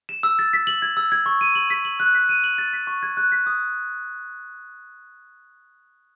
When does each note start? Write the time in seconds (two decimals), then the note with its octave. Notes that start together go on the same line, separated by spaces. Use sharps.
0.09 E7
0.23 E6
0.39 A6
0.53 B6
0.67 F#7
0.82 G#6
0.97 E6
1.12 G#6
1.26 C#6
1.41 D#7
1.55 F#7
1.70 B6
1.85 F#7
2.00 F#6
2.15 B6
2.29 D#7
2.44 F#7
2.58 A6
2.73 B6
2.87 C#6
3.03 G#6
3.17 F#6
3.32 B6
3.46 D#6